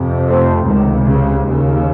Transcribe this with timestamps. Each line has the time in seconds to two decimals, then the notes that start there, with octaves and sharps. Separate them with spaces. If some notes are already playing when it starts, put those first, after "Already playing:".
Already playing: F2 C3
0.28 A3 C4
0.67 C#2 C3 D#3
1.06 C#3
1.45 D#2 C#3